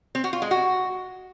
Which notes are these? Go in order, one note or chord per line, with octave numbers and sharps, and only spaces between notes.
C4
F#4
F4
G#3
F#4